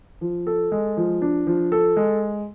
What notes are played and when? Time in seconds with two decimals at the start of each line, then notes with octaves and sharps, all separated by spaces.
0.21 F3
0.47 A4
0.72 G#3
0.97 F3
1.22 D4
1.47 F3
1.72 A4
1.97 G#3